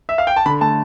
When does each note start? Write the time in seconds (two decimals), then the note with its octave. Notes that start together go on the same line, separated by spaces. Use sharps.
0.09 E5
0.18 F5
0.27 G5
0.36 A5
0.46 D3 B5
0.61 A3 A5